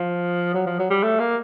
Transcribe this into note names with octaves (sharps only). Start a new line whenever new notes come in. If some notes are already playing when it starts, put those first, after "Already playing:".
Already playing: F3
F#3
F3
F#3
G3
A3
A#3